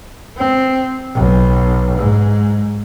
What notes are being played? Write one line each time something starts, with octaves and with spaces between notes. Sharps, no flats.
C4
B1
G#2